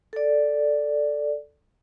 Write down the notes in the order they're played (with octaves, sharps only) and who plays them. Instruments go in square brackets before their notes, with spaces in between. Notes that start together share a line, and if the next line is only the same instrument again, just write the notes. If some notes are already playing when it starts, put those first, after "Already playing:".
[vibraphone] A4 D5